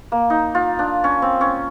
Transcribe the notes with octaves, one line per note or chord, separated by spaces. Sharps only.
A#3
D#4
F4
D4
C#4
C4
C#4